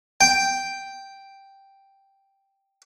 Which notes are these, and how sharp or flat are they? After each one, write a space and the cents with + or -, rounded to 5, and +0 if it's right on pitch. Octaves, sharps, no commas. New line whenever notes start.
G5 +0